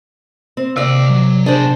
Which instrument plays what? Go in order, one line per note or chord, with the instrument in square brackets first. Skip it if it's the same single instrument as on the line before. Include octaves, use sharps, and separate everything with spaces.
[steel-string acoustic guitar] C4
[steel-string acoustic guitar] D#2 D5 [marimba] C3 [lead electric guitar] D#5 F5
[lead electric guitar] F#3
[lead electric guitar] B2 G#4 [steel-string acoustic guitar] D4 C5